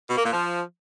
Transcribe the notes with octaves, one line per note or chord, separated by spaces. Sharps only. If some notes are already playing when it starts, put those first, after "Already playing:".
B2
A#3
A#2
F3